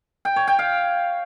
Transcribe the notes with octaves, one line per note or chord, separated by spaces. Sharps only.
G5
C#5
G5
F5